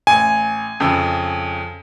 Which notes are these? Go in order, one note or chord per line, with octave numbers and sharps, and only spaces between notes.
A1 G#5
F2 C#3 E6